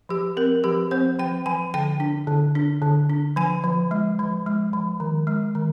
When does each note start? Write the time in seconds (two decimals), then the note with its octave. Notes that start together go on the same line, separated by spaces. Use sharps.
0.09 F3 G4
0.37 C4 A#4
0.64 F3 G4
0.91 C4 C5
1.19 F3 G5
1.46 F3 G#5
1.74 D3 G5
2.00 D4
2.27 D3
2.55 D4
2.82 D3
3.10 D4
3.36 F3 G#5
3.64 F3
3.91 G#3
4.19 F3
4.46 G#3
4.73 F3
5.00 D#3
5.27 G#3
5.55 D#3